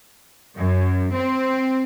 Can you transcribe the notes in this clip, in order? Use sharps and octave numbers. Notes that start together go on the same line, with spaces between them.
F#2
C4